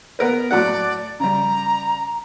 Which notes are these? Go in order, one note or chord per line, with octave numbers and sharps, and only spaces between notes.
B3 A#4 B4
A2 F#3 D5 F#5
C#3 G3 A#5